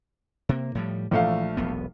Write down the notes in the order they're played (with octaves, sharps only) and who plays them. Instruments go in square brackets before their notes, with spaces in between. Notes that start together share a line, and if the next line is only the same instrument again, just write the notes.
[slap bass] C3 A#3
A2 F3 G3
[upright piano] A#1 A3 F5 [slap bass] E3
[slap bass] E1 B1 B3